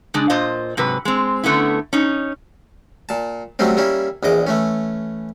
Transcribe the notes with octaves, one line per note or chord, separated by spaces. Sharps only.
C#3 G#3 D4
A#2 F4 C5 D#5
G#2 C3 F#3 B4
G#3 C4
D3 A3 B3 C#4 E4
C#4 D#4
A#2 A5
F#3 G3 A3 C4 C#4
G3 A#3 C#4 E4
A#1 E2 D#5 D6
E3 A3 C#4